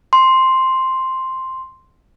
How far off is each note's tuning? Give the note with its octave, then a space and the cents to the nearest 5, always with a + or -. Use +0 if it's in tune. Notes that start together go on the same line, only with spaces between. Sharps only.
C6 +0